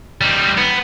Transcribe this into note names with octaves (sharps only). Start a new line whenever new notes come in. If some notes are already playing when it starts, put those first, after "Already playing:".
G3 D#4
B3